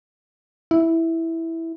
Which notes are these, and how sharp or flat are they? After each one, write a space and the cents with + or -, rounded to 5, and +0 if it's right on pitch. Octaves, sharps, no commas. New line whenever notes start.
E4 -5